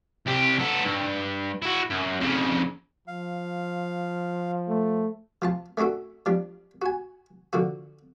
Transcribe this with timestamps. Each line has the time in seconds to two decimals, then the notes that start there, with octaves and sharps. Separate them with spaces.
0.26 C2 G4
0.59 B3 A4
0.84 G2
1.62 E4 F#4
1.90 F#2
2.20 F2 C#3
3.08 F3 F5
4.68 A3
5.42 F3 F4 A5
5.77 A3 C#4 D4 F#4 A4
6.26 F3 G3 D4
6.82 F#4 G#5
7.53 D3 F3 F#4